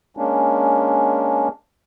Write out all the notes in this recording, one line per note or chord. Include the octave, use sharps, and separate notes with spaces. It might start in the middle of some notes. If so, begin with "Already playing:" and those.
G#3 A#3 C#4 D4